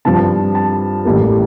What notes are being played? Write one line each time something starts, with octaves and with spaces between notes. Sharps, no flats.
G2 F3 C4 A5
A5
A1 A2 G3 A#3